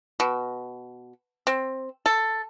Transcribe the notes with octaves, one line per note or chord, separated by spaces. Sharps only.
B2
C4
A4